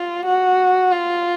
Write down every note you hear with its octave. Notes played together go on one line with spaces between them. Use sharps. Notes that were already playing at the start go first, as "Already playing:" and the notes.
Already playing: F4
F#4
F4